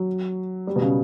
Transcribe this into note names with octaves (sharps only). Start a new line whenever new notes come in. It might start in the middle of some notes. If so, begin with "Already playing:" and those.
Already playing: F#3
G3
B2
C#3